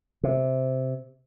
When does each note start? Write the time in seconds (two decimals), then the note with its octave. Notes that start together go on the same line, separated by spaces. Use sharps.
0.23 C3